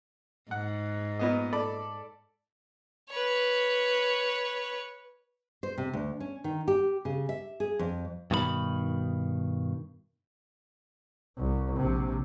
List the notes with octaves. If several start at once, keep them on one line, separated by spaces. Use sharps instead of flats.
G#2 F#5
A#2 B3 D#5
A4 D5 B5
B4 C#5
C5
C3
D2
C#4
D#3
G4
C#3
E5
G#4
F2
G2 B2 D#3 G4 B5
C2
A#1 C3